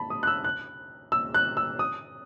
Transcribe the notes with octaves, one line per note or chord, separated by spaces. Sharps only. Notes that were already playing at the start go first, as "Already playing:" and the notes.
Already playing: A5 B5
D#6
F#6
E6
F#6
E6
F#6
E6
D#6